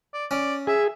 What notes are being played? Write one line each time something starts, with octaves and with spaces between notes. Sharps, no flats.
D5
C#4 D5
G#4 E5